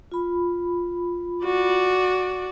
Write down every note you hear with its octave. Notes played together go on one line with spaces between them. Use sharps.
F4 B5
F#4 D5